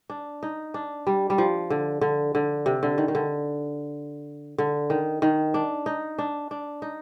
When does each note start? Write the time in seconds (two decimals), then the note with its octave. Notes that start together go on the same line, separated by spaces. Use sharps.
0.10 D4
0.43 D#4
0.74 D4
1.07 G3
1.30 G3
1.38 F3
1.70 D3
2.01 D3
2.35 D3
2.66 C3
2.83 D3
2.98 D#3
3.08 D#3
3.15 D3
4.58 D3
4.90 D#3
5.22 D#3
5.54 D4
5.86 D#4
6.19 D4
6.51 D4
6.82 D#4